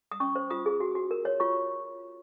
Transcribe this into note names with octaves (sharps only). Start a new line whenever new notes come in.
D#6
C#4 C#6
C5
F4 D#6
G#4
F#4
F#4
A#4
C#5
F4 C#6